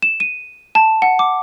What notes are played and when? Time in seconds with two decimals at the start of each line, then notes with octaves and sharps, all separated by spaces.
0.02 E7
0.20 D#7
0.75 A5
1.02 F#5
1.19 D6